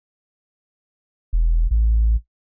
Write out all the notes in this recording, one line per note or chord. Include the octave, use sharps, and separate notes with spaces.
E1
A1